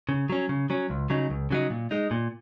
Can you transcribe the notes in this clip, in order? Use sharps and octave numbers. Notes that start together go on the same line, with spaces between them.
C#3
F#3 C#4
C#3
F#3 C#4
C#2
C#3 F#3 D#4
C#2
C#3 F#3 D#4
A#2
G#3 D#4
A#2